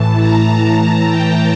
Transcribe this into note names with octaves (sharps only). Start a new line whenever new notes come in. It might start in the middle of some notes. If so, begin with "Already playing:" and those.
Already playing: A2 E3 A5
A#5
A5
G5